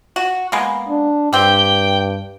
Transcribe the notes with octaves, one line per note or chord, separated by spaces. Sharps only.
F#4
G#3 A#3 B3
D4
G2 C4 G4 G5